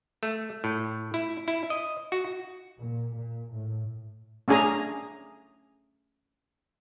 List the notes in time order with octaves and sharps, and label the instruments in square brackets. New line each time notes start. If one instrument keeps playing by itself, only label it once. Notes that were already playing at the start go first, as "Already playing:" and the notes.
[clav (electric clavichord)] A3
A2
E4
E4
D#5
F#4
[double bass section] A#2
A#2
A2
[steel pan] A3 C#4 D4 G#4 G#5 A#5